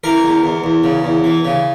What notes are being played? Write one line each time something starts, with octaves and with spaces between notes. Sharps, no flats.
E3 A#4
E2
E2
E2
C#3
E2
E3
C#3